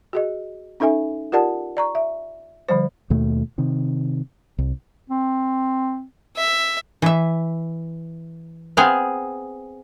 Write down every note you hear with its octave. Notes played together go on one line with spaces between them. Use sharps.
F#4 G#4 D#5
C#4 D#4 A4 E5 G#5
F4 G4 A#4 D5 F#5 A5
D5 A#5 C#6
E5
D3 F3 G3 C5
D#2 B2 A3
C3 D#3
C2
C4
E5
E3 E5
B3 C4 G#4 F5